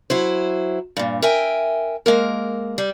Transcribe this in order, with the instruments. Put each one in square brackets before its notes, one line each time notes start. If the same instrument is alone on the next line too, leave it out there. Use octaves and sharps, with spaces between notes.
[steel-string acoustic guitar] F#3 E4 C5
G2 A#2
A#4 E5 G5 G#5
G#3 A#3 A#4
G3